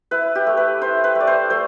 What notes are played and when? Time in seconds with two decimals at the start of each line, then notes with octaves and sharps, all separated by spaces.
0.11 E4 B4
0.35 G4
0.47 A3
0.57 B4
0.81 E4 C5
1.04 B4
1.15 A3
1.20 D5
1.27 C5
1.50 A3 C5